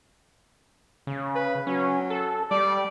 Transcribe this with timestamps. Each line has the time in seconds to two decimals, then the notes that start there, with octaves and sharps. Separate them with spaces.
1.07 C#3
1.36 B4
1.67 F#3 C#4
2.10 A4
2.51 G3 D5